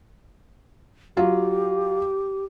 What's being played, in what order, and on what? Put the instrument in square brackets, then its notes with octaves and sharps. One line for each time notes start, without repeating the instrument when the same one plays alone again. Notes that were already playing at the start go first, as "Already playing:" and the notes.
[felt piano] F#3 F4 [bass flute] G4